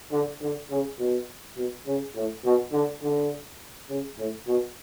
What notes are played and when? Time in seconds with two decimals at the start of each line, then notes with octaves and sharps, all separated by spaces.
0.11 D3
0.41 D3
0.70 C#3
0.99 B2
1.57 B2
1.87 C#3
2.15 A2
2.45 B2
2.72 D3
3.02 D3
3.89 C#3
4.18 A2
4.47 B2